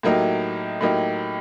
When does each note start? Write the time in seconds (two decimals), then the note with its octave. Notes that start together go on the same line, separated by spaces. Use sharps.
0.03 A2 F#3 A#3 D#4 G4
0.81 A2 F#3 A#3 D#4 G4